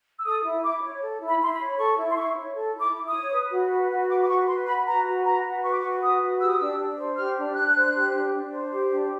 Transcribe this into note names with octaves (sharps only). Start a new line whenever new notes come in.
E6
A4 D#6
E4
E4 D6
C#5
A4
E4
B5
E4 C6
B5
C#5
A4 C#6
E4
C6
E4 C#6
C#5
A4
E4
D6
E4
D#6
C#5
B4
F#4
B4
F#4
B4 D6
D6
F#4 C#6
B4 C6
F#4 B5
B4 A#5
F#4
B4 A#5
F#4
B4 C#6
D6
C#6
F#4
B4 D#6
F#4
G4 E6
D#6
D4 E6
D4
C5
G4 F6
D4
D4 F#6
C5
G4
D4
D4
C5
G4
D4